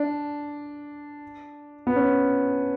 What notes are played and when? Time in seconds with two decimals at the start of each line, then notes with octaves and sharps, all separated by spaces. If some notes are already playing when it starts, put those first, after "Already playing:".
Already playing: D4
1.87 B3
1.96 C#4